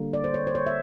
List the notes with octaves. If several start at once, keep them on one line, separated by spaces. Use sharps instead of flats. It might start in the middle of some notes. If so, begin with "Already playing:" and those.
Already playing: D3 G3 A#3
D5
C5
C#5
C5
C#5
E5